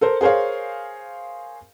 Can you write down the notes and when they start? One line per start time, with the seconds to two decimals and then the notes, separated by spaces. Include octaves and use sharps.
0.01 A4 A#4 C5
0.21 G#4 A#4 C5 C#5 F5